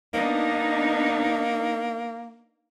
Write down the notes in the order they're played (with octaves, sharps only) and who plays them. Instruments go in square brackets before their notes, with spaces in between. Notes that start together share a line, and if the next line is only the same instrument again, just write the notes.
[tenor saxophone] A#3 [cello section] B3 D4 D#4